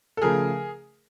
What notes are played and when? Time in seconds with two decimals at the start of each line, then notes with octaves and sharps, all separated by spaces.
0.17 A4
0.22 C#3 F3 A3 G#4 A#4